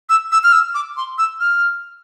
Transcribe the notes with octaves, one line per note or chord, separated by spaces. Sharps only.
E6
E6
F6
E6
D6
C6
E6
F6